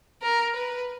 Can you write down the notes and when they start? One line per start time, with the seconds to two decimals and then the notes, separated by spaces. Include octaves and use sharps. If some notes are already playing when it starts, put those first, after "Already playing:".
0.22 A#4
0.56 B4